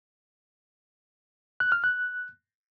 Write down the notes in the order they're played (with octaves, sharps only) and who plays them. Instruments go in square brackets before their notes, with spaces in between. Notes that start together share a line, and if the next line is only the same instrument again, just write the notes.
[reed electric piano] F#6
F6
F#6